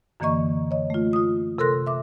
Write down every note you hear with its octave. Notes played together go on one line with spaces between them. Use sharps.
F#2 D3 E3 A#3 D#5 C#6
C#5 D#5
A3 F4
F4 D#6
C3 A4 A#4 C6 F#6 A#6
E5 D6